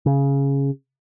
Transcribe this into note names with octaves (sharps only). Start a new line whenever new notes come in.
C#3